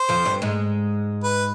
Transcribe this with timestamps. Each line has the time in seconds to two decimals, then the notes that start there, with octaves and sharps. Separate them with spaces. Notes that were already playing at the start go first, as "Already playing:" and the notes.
Already playing: C5
0.09 F2 F3
0.25 G2 G3
0.42 G#2 G#3
1.24 B4